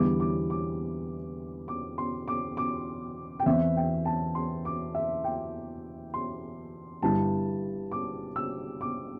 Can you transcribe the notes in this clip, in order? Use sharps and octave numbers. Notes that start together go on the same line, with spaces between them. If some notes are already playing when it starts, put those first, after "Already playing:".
Already playing: E2 D3 G3 E4 D6
D6
D6
D6
C6
D6
D6
G5
E2 E3 C4 E5
G5
A5
C6
D6
E5
G5
C6
G1 G2 G3 E4 A5
D6
E6
D6